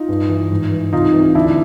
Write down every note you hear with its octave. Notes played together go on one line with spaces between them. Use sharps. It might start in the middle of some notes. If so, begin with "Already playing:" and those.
Already playing: D#4 F4
G2
E3
G#2
E3
C2 D#4 F4
C3 E3
D2 D4 E4